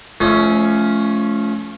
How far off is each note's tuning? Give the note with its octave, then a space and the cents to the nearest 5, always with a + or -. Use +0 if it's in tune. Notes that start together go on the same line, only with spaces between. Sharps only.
F3 -25 A3 -30 C#4 +10